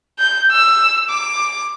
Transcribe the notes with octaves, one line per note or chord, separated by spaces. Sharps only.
G6
E6
D6